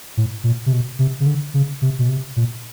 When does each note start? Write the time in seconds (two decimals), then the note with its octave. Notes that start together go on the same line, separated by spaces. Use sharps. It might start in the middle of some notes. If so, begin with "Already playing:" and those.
0.17 A2
0.44 A#2
0.66 C3
0.72 B2
0.99 C3
1.20 C#3
1.26 D3
1.54 C#3
1.82 C3
1.99 B2
2.09 C3
2.36 A#2